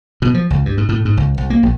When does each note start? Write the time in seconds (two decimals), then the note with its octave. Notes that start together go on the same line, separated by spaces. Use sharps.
0.22 B2
0.34 F3
0.50 C#2
0.65 G2
0.78 G#2
0.89 A2
1.05 G#2
1.17 C#2
1.38 C2
1.50 A#3
1.63 A#1